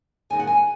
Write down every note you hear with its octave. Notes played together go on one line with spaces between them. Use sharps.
F#2 D#3 G#3 G#5
F#5
G#5